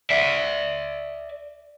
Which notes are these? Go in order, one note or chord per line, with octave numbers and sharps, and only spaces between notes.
D5 E5